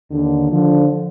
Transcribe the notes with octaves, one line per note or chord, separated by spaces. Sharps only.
D#2 D3
D3 F3